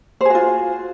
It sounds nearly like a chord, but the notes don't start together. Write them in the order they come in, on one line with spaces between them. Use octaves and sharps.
C5 G#4 F#4 F4